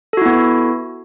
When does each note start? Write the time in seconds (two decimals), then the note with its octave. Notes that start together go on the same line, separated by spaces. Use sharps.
0.13 A4
0.17 F#4
0.21 E4
0.26 B3